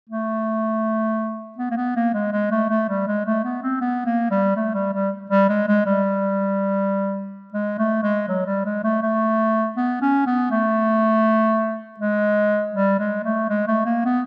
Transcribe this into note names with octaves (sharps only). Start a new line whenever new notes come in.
A3
B3
A#3
B3
A#3
G#3
G#3
A3
A3
G3
G#3
A3
B3
C4
B3
A#3
G3
A3
G3
G3
G3
G#3
G#3
G3
G#3
A3
G#3
F#3
G3
G#3
A3
A3
B3
C#4
B3
A3
G#3
G3
G#3
A3
G#3
A3
A#3
B3